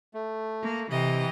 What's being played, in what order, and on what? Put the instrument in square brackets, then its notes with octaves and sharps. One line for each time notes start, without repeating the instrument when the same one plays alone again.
[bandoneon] A3
[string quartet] A#3
[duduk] C3 [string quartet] E3 D#5 G5